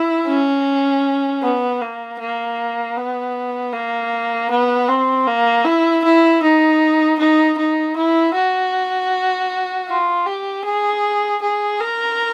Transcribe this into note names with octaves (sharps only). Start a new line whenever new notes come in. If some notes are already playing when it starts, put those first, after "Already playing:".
Already playing: E4
C#4
B3
A#3
A#3
B3
A#3
B3
C4
A#3
E4
E4
D#4
D#4
D#4
E4
F#4
F4
G4
G#4
G#4
A#4